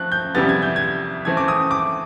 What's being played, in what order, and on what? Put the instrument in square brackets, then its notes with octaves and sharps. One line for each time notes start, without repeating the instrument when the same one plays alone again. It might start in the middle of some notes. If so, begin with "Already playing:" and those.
Already playing: [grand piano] F3 A3 C4 F#6
G6
F2 C3 E3 G3 B3 A6
G#6
G6
G#6
C#3 E3 A3 C4 G#6
D6
D#6
D6